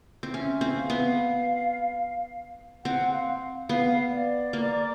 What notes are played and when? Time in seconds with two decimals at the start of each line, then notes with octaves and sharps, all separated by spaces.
0.23 C4
0.33 C#4 E5
0.61 C4
0.76 F5
0.90 B3
2.85 C4 F#5
3.13 F5
3.69 B3 F5
4.11 D5
4.53 A#3